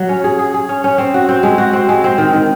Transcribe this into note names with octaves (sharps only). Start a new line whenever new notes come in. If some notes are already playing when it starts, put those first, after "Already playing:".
Already playing: F#3
C#4
G#4
G#4
G#4
C#4
C#4
C4
F#4
C4
G#3
F#4
C4
G#3
C4
D#3
D#3